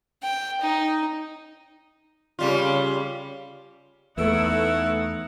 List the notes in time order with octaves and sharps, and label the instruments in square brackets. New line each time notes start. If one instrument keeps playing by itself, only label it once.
[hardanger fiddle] G5
D#4
[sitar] C#3 G3 F4
[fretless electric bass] E2 [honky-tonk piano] A3 B3 [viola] D#4 F#5 [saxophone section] E4